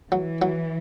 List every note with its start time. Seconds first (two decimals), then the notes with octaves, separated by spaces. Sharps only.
0.12 E3 F#3
0.42 F#3